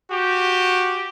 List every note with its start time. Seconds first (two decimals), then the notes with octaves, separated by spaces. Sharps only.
0.11 F#4 G4